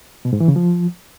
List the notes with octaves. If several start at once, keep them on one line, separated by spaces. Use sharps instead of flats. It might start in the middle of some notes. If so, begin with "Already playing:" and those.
B2
G#2
E3
C#3
F3